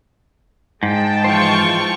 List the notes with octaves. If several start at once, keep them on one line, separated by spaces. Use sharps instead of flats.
G#2 G#3 G5 A5
E3 F3 F4 C5 C#6